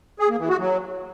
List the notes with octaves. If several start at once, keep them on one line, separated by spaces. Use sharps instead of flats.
G#4
A#3
E3
F#4
F#3